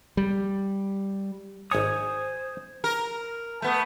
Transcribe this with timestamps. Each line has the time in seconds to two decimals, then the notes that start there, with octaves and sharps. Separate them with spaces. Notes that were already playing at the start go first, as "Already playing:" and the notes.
0.17 G3
1.71 G#1 C5 C#5 G#5 D#6
2.84 A#4
3.62 A3 B3